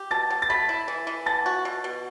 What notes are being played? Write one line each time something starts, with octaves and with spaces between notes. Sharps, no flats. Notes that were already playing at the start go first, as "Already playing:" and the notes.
Already playing: G4
B2 A5 A6
B2
A6
A3 B5 B6
E4
E3
E3
B3 A5 A6
F#4
B2
B2